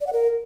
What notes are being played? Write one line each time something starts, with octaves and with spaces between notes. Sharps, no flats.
D5
F#5
A#4